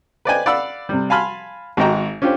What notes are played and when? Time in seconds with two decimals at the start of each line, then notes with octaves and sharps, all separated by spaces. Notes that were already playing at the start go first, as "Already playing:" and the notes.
0.25 B4 C5 D5 D#5 G5 G#5
0.46 D5 F5 F#5 B5 E6
0.89 C3 G3
1.10 F5 G#5 A5 B5 C6 F6
1.77 G#1 G#3 F#4 D#5 G5 A#5
2.22 C#4 D4 F4 G4 C5